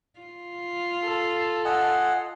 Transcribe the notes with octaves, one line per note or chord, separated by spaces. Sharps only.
F4
A4
D#5 F#5 G#5